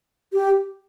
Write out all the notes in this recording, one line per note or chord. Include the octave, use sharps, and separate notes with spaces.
G4